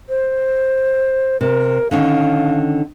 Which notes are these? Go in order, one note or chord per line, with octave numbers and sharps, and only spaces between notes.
C5
C3 A#4
D3 D#3 C#4 F5